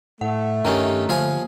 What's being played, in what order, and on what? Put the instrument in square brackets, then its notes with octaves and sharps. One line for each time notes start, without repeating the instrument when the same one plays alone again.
[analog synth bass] A2 [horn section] A3 [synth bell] F#5
[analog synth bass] G2 [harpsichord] D#3 C#4 D#4 [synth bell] G4 E5 A#5
[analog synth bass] D3 [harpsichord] F3 F5 G#5 [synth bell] A#3